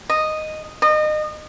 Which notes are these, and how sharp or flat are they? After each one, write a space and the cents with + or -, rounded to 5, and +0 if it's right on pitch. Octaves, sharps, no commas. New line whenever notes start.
D#5 -5
D#5 -30